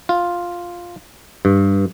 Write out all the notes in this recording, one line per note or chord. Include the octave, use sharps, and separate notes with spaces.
F4
G2